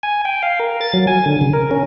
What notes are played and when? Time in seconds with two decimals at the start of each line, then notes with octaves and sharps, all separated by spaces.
0.03 G#5
0.25 G5
0.43 F5
0.60 A#4
0.81 A6
0.93 F#3
1.07 G#5
1.26 D3
1.41 C#3
1.53 A#4
1.71 C#4